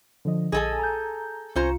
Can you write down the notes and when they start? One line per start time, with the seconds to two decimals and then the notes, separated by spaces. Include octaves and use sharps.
0.25 D3 F3 D#5
0.52 A#1 G#4 A4 D#5 G#5 A#6
0.79 A#5 G6
1.56 C2 C#4 F4 C5 A#5 C#7